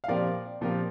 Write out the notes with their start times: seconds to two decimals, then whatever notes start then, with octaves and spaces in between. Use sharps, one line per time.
0.04 F5
0.08 A#2 F3 C4 G4 A#4 D5
0.61 A#2 F3 C4 G4 A#4